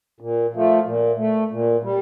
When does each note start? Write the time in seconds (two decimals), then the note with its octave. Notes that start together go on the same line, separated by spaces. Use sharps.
0.20 A#2
0.53 F3 A3
0.86 A#2
1.18 A3
1.51 A#2
1.83 G3